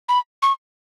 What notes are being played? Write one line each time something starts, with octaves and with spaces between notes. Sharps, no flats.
B5
C#6